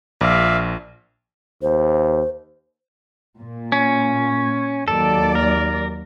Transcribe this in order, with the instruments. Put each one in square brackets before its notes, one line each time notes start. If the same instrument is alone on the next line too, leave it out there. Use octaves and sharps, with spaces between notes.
[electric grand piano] A#1 [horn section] D5 E5 F5
[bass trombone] D#2 [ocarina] C5
[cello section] A#2
[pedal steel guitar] C#4
[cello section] D#2 F#3 D5 [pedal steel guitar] A4
[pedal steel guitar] A#4